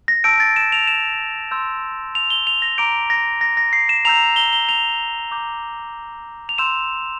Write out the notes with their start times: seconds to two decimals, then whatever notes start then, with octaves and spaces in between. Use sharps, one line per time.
0.08 A#6
0.24 A5 E6 G6 D7
0.40 A6
0.56 E7
0.72 F7
0.87 E7
1.51 C6 E6 G6
2.15 F7
2.30 G7
2.47 F7
2.62 A#6
2.78 A#5 D6 G6 D7
3.10 A#6
3.41 A#6
3.57 A#6
3.73 C7
3.89 E7
4.05 A#5 E6 G6 F7
4.36 G7
4.53 G7
4.69 F7
5.31 A#5 D6 G6
6.49 F7
6.58 C6 E6 G6 E7